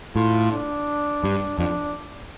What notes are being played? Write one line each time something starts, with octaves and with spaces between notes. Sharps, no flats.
A2 F4
D4
G2
F2 D4